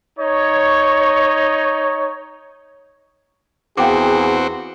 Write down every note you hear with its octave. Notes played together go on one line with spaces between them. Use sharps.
D#4 C#5
E2 C4 F#4 G#4 F5 G5 D6